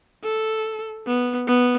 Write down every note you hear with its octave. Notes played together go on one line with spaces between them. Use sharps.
A4
B3
B3